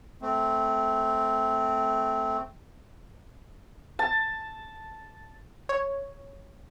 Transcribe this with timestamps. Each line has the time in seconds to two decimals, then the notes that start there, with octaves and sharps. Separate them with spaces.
0.22 A3 C4
3.99 A5
5.69 C#5